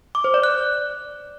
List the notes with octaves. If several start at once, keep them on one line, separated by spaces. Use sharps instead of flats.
D6
C5
D5
F#6